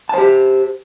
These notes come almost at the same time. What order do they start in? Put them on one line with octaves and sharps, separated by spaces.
A5 C5 G4